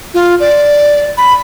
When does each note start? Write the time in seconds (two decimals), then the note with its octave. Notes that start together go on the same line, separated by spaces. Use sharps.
0.14 F4
0.40 D5
1.18 B5